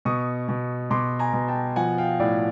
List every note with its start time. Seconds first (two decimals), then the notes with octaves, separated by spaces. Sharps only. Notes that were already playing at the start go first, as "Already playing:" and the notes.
0.05 B2 C#6 D#6
0.49 B2
0.91 B2 C6 D6
1.19 G#5 A#5
1.33 B2
1.48 G5 A5
1.76 F3 F#5 G#5
1.98 F5 G5
2.20 A2 D5